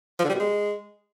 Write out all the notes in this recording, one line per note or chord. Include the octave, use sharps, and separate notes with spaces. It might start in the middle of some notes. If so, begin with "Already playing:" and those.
F3
D3
G3
B2
G#3